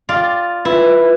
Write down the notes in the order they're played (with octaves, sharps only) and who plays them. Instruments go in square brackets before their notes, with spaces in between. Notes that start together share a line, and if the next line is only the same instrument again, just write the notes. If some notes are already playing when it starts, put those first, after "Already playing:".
[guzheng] F4 D5 F5
[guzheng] E4 [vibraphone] F4 B4